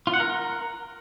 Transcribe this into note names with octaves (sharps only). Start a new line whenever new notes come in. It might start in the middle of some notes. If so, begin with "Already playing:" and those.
F4
F#5
A#4